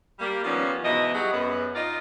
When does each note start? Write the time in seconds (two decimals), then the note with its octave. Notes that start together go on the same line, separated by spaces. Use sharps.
0.19 G3 A#3
0.45 D#3 F3 G3 A#3 B3 C#4
0.83 G#2 B2 E3 E4 D#5
1.14 F#3 G3 F#4 G#4
1.32 F#2 B3
1.75 D#4 F4 A#4 D5 D#5